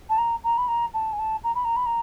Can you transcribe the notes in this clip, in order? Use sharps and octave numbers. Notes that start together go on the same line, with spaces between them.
A5
A#5
A#5
B5
A#5
A5
G#5
A5
A#5
B5
A#5
B5
A#5